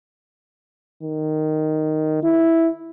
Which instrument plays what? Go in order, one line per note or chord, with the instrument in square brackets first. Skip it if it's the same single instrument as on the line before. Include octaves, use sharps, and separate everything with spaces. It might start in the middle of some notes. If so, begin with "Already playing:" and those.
[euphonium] D#3
E4